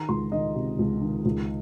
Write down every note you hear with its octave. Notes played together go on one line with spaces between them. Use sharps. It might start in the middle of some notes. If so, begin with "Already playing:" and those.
Already playing: D#3 A#5
C#2 C6
D#3 D#5
C3
C#2
D#3
C#2